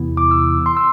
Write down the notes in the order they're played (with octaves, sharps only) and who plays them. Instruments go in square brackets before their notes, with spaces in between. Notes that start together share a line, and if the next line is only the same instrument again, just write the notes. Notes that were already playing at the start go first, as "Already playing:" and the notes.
Already playing: [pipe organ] E2 C3 E3 B3 E4
[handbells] D6
E6
C6
E6